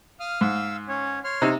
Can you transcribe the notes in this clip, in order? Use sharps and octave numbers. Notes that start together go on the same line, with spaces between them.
F5 D#6 F6
G#2 F5 E6
C#4 C#5
C#5 C6 F6
C3 D#4